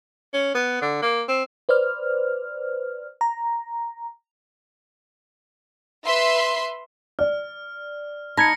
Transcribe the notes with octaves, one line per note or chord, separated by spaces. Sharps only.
C#4
B3
D3
A#3
C4
B4 C5 D5 F6
A#5
B4 E5 C6
D5 F6
D#4 A5 B5 G#6 A#6 C#7